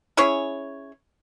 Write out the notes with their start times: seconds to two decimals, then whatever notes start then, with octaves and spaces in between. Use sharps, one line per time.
0.17 C#4 E4 G#4 C#5